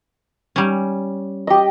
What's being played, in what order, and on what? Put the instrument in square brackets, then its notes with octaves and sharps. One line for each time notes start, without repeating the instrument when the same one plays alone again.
[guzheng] G3 C#4
[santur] G4 D#5